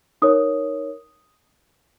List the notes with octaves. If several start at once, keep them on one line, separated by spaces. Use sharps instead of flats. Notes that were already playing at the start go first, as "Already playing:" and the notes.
D#4 A#4 C#5 D#6